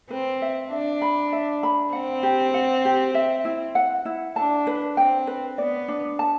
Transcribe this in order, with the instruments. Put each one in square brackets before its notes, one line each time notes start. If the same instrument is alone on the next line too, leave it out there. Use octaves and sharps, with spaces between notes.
[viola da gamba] C4 [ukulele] B4
[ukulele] E5
[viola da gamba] D4 [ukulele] E5
[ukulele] B5
E5
B5
[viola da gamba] C4 [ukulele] F#5
[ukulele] G4
F#5
G4
E5
E4
F#5
E4
[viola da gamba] D4 [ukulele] A5
[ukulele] B4
[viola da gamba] C4 [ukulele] G5
[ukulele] B4
[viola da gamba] B3 [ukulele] D5
[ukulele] D4
A5